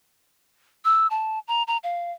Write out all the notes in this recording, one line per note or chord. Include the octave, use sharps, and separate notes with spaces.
E6
A5
A#5
A#5
F5